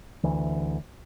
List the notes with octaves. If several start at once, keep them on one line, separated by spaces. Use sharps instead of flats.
D2 E3